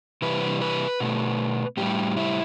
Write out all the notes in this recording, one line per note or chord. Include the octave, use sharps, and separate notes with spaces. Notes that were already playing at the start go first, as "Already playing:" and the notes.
C3 E3 G3 B4
B4
B2 A3
A2 G3 G4
E4